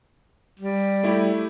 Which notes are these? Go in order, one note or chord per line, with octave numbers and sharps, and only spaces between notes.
G3
A3 E4 G4